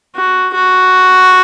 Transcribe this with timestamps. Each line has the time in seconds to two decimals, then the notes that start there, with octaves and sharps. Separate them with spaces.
0.16 F#4
0.54 F#4